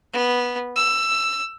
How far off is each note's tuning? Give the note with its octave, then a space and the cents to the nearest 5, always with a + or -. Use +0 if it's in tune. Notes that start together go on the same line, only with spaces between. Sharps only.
B3 -10
E6 +15